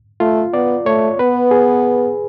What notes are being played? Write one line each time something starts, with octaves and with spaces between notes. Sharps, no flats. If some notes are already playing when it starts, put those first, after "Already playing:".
A3 F4
B3 D5
A3 C#5
B3 B4
G#4